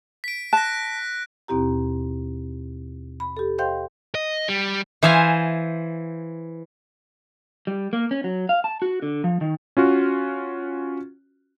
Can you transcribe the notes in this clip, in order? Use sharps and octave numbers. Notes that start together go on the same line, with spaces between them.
B6 D7
A5 F#6 A#6
D#2 B2 C4 E4 G4 A#5
B5
G4 A4
C5 D#5 F5 G5 C6 G6
D#5
G3
E3 C5 E5 F5 G#5
G3
A#3
C#4
F#3
F5
A5
F#4
D3
F3
D#3
C#4 F4 F#4